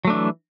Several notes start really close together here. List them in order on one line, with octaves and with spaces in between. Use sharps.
F#3 A3 D4 E3